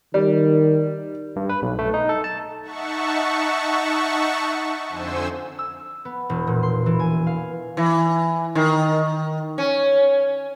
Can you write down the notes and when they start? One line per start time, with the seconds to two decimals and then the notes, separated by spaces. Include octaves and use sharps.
0.14 D#3 G3
1.36 G2
1.49 B4
1.62 B1
1.79 A3
1.94 D#4
2.09 A4
2.24 A5
2.62 D#4 E5 F#5 A5 C#6
4.89 F2 D3 C5 G#5 E6
5.59 E6
6.05 B3
6.29 E1
6.47 A#2
6.63 C6
6.86 E3
6.99 G#5
7.27 F5
7.77 E3
8.55 D#3
9.58 C#4